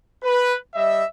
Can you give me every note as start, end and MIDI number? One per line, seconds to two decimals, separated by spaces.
0.23 0.56 71
0.74 1.04 55
0.74 1.04 75
0.74 1.04 76